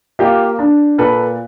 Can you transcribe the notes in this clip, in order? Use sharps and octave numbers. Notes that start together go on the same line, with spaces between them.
A#3 F4 G4
D4
A#2 A4 B4